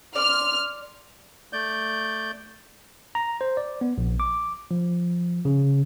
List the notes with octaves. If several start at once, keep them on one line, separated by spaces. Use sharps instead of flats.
D5 C6 F6
A3 D5 G6
A#5
C5
D5
B3
A#1
D6
F3
C#3